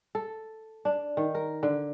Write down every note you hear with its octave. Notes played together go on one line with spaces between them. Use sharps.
A4
D4
D#3
A#4
D3